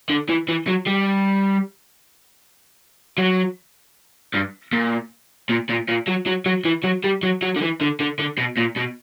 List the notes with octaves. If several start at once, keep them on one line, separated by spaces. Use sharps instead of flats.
D3
E3
E3
F#3
G3
F#3
G2
A#2
A#2
A#2
A#2
F#3
F#3
F#3
E3
F#3
G3
F#3
F#3
D3
E3
D3
D3
D3
B2
A#2
B2